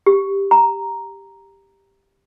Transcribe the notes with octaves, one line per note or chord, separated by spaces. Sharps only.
G4
A#5